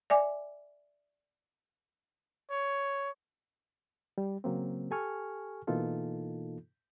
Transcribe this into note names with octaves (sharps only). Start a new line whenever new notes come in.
D5 E5 G#5 D6
C#5
G3
C#3 F#3 A#3 C4
G4 A4 G#5 C#6 F6
B2 E3 A#3 D#4 F4 A4